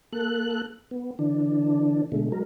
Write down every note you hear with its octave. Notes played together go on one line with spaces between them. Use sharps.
A#3 A4 F#6
B3
D3 E3 D4
B2 D3 G#3 A3
F#3 G#3 A#4